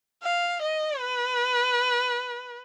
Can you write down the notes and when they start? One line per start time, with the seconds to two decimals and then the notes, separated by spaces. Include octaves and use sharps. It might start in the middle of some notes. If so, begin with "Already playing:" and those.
0.23 F5
0.62 D#5
1.00 B4